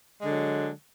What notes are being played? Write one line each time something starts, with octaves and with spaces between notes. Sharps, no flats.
D3 F#3 G#3